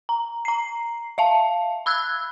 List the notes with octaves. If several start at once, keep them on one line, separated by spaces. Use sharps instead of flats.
A#5
A#5 C7
E5 F5 A5
B5 E6 F#6 G#6